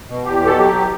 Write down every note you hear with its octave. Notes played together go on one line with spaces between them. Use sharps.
B2
E2 G4
B2 A4
F#3 G4